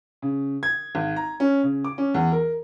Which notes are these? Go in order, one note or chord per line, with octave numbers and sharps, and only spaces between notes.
C#3
G#6
G#1
A#5
C#4
C#3
D6
C#4
E2
A#4